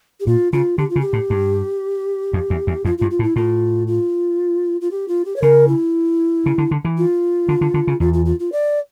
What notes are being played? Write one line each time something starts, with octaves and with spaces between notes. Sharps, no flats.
G4
A#2 F4
C#3 F4
D3 G4
F4
C#3
G4
A2
G2
F2
E2
E2
F2 F4
G2 F4
F4
A2
E4
A2 F4
F4
F4
G4
F4
G4
C#5
C#3 A#4
E4
C#3
D3
D3
E3
F4
D3
D3
D3
C#3
E2 F4
F4
F4
F4
D5